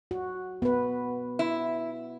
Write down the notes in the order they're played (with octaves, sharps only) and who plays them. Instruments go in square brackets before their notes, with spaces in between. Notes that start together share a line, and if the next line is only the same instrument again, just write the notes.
[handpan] F#4
B3 B4
[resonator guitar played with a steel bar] E4